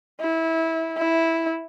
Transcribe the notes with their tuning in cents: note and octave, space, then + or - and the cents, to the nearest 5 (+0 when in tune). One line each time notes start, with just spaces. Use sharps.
E4 -20
E4 -5